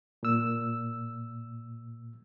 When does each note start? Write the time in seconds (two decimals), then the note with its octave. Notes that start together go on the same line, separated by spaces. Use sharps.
0.23 A#2 E6